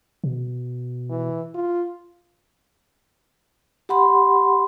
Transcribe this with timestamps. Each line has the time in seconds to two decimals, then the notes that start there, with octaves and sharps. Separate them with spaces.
0.24 B2
1.10 E3
1.55 F4
3.89 G4 F#5 B5 C6